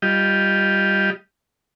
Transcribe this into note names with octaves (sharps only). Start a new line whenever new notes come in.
G3 F4 G4 D#5